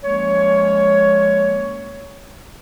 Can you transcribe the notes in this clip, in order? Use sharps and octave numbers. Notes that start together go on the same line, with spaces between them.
F3 G#3 A#3 C#4 C#5